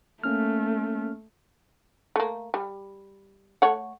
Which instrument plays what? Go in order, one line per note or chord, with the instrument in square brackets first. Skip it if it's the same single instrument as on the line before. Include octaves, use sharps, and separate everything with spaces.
[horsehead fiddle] A3 [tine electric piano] A#3 C#4 F6
[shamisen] A3 A#3
G3
A3 C#5 F#5